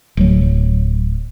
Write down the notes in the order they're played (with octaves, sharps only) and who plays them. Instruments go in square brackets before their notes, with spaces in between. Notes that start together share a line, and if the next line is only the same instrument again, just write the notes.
[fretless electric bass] D1 F#3